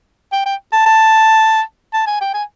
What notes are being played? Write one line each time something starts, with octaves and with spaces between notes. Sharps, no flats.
G5
G5
A5
A5
A5
G#5
G5
G#5